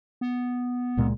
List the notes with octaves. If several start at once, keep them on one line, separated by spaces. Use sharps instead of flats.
B3
C#2 A#2 G#3